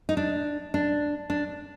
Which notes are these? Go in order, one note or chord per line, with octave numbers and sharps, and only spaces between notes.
D#4
D4
D4
D4